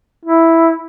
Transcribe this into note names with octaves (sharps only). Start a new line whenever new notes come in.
E4